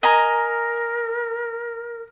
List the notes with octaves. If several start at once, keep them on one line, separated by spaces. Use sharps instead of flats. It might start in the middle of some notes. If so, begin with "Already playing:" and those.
A#4 D#5 G#5 A#5